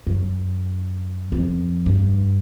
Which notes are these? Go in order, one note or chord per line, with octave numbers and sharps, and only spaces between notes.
F#2
F2
G2